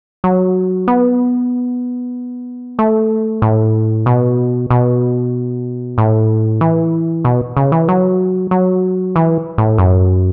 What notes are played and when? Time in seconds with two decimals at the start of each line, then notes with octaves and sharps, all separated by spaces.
0.24 F#3
0.88 B3
2.79 A3
3.42 A2
4.06 B2
4.70 B2
5.98 A2
6.61 E3
7.25 B2
7.57 C#3
7.72 E3
7.89 F#3
8.51 F#3
9.16 E3
9.58 A2
9.78 F#2